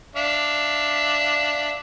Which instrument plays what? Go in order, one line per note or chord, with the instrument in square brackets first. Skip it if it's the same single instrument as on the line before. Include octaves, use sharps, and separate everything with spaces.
[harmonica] D4 E5 F5